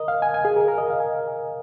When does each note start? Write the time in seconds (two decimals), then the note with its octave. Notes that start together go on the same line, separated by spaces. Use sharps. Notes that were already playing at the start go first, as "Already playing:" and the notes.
Already playing: A#4 D#5
0.08 F5
0.22 G#5
0.34 G#5
0.45 G#4
0.56 A#4
0.68 A#4
0.78 D#5
0.90 F5
1.00 G#5